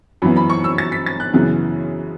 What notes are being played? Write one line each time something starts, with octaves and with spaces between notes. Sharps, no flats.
F#2 E3 B3 B5
B5
C#6
E6
A6
B6
A6
F#6
F#2 C#3 E3 B3